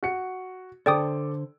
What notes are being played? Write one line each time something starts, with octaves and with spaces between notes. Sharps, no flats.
F#4 C#7
D3 A4 C5 D5 G5 D6 D#6